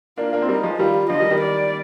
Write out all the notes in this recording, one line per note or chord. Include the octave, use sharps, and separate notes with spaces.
A#3 D4 F4
A#3 D4
C4
G3 A#3 D#4
F3 G#3
D#3 G3 F4
D3 F3 D#5
D#3 G3
D#3 G3
D5